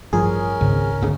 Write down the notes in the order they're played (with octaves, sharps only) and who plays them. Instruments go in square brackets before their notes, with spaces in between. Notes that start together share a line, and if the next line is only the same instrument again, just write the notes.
[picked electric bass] A1 G2 F3 [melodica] C#4 A#4 [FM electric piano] G#4
[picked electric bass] G#1 [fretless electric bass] C#2 G#2
[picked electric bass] G#1 D2 C#3